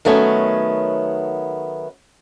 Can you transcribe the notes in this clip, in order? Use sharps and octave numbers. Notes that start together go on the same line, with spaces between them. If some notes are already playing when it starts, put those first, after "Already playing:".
D#3 F#3 A3 B3 C#4